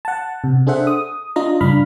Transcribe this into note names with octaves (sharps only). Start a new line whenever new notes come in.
F#5 A5
C3
D4 G#4 A4 C5 E5 F#5
D#6
D4 F4 D#5 A#5
G2 C#3 D4 F5 B5 F6